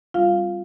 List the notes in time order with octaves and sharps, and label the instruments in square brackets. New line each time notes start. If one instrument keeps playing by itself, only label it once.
[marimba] G3 C4 F4 F5